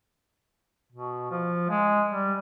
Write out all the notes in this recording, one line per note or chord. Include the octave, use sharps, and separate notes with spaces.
B2
F3
G#3
G3